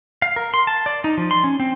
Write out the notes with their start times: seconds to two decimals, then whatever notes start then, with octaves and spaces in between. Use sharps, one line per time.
0.22 F5
0.36 A#4
0.54 C6
0.67 A5
0.86 D5
1.04 D#4
1.18 F3
1.31 C6
1.44 C#4
1.60 C4